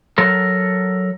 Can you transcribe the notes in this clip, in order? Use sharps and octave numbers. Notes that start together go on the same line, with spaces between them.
F#3 A4 A#4